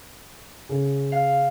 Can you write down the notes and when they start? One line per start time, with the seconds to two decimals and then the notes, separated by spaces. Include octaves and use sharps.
0.69 C#3
1.12 F5